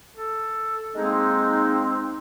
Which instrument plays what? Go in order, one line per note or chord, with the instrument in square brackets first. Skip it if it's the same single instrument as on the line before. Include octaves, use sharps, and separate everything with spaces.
[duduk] A4
[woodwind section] G#3 A#3 D#4 [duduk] C4